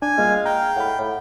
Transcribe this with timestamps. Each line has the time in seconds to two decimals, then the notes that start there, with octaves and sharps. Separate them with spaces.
0.02 D4 G#5
0.18 G3 G#3 A#3 F4 F5
0.46 G5 A#5
0.76 A2 F#5 B5
0.99 A2